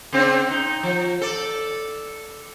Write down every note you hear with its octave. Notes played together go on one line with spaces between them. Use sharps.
C#3 C4 D4
D#4
F3
A4 D5